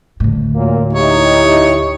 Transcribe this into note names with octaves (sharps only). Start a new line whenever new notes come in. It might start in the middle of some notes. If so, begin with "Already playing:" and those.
D2 A2
A#2 F#3 A#3
D#4 E4 G4 C#5